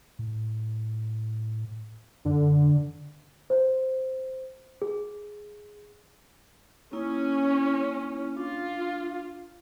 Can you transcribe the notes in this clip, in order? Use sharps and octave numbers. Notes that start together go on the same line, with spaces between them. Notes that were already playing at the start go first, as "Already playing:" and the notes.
A2
F#2 D3
C5
G#4
A#3 C#4 D#4 E4
D4 F4